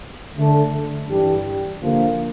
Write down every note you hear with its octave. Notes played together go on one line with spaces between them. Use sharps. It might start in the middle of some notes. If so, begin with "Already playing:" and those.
D3 A3 D4 A4
G2 E3 G3 D4 G4
D3 F3 A#3